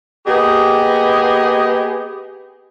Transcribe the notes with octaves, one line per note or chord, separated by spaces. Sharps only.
A#3 B3 G4 G#4 D#5